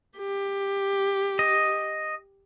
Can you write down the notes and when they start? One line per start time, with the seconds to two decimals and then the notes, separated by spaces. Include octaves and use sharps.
0.18 G4
1.39 D#5